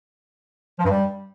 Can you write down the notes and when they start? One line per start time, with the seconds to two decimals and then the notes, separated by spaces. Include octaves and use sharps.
0.79 F3
0.84 G2
0.90 G3